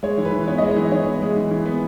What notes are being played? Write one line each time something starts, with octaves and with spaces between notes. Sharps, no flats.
G#3 C#5
E3
B4
E3
B3 C#5
G#3 D#5
C#5
E3
E3 C#5
B3
G#3
E3
E3
B3